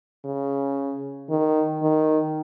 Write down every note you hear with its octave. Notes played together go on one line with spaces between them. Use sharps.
C#3
D#3
D#3